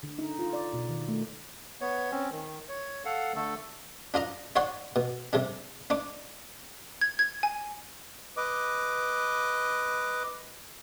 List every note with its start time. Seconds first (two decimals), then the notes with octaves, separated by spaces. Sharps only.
0.03 D3
0.19 D#4
0.39 F4
0.53 D5
0.73 B2
0.89 D#3
1.09 A3
1.81 B3 C#5
2.11 C4 C#4
2.32 D#3
2.69 C#5
3.05 A4 F5 F#5
3.35 D3 A3 A4
4.14 D4 F4 D#5 A#5
4.56 D#4 C#5 D5 F#5 C6
4.96 B2
5.33 C3 G3 D4
5.90 D4 D#4 D6
7.01 G#6
7.19 G#6
7.43 G#5
8.37 B4 D#5 D6